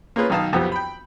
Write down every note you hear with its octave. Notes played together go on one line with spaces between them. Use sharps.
A#3 C#4 F4 G#4 B4
B1 D#3 D#4 F5 A5
B1 F2 F3 B3 G4
G5 B5